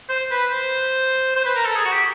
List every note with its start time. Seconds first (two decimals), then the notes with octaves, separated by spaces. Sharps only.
0.09 C5
0.31 B4
0.51 C5
1.36 C5
1.45 B4
1.55 A#4
1.65 A4
1.76 G#4
1.85 F#4
1.91 G4